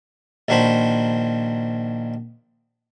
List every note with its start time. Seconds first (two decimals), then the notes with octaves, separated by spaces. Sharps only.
0.48 A#1 D#3 D4 F#4 C5 B5